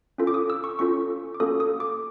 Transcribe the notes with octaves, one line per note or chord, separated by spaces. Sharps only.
C#4 F4 A4
D6
D#6
E6
C#6
C#4 F4 A4 C#6
D6
A#3 C#4 F#4 A4 D#6
D#6
D6